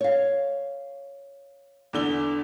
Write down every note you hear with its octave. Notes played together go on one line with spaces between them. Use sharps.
C#5 F5
E2 D3 G7